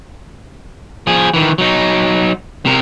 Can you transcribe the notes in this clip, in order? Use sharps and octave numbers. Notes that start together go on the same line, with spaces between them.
F3 G#4
D#3 E3
F#3 D#4
C3 A#4